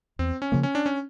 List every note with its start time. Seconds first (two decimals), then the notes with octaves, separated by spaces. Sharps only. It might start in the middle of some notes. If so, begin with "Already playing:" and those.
0.19 E2 C4
0.42 C#4
0.52 C#3 F3 A#3
0.63 C#4
0.75 D4
0.86 C#4